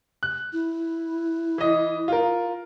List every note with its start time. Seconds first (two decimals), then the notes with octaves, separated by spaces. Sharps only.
0.23 F#6
0.53 E4
1.58 E3 D#5
2.08 F4 A#4